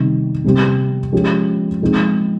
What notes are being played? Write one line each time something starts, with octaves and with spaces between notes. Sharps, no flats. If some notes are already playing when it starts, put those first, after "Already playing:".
Already playing: C3 D#3 G3
C3 G3 C4 G4
F3 G#3 C#4 G4
F3 G#3 C4 D#4